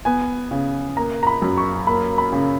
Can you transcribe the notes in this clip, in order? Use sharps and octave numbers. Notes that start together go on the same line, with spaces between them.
B3 G#5
C#3
A#3 A#5
A#5
B5
F#2
C#6
A#3 B5
B5
C#3